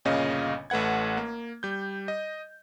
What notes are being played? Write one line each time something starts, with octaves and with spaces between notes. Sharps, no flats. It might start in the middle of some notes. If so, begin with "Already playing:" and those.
G1 A#2 C#3 C#4 D#5 F5
A1 A3 B4 F#5 G#6
A#3
G3 G6
D#5